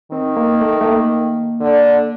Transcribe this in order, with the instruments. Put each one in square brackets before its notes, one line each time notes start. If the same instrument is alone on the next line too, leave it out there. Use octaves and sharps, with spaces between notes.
[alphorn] D#3 [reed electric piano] C4
[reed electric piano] A#3
A3
A3
A#3
[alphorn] D3